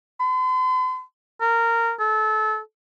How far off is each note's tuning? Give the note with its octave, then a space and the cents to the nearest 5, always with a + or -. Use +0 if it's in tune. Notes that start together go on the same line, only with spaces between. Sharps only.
C6 -45
A#4 -15
A4 -25